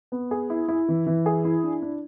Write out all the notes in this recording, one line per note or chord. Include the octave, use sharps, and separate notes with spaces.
B3
G#4
E4
E4
E3
E3
G#4
E4
D4
D4